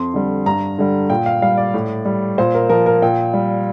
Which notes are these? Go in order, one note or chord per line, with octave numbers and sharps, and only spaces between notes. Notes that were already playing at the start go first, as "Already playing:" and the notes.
Already playing: F2 C6
D3 G3
G2 A#5
D3 G3
A#2 G5
F5
G3 F5
D5
A2
G3
A#2 C5
A#4
F3 A#4
A#4
A#2 G5
G3